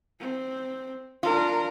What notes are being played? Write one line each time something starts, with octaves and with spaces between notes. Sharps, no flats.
C4
D4 F4 A#4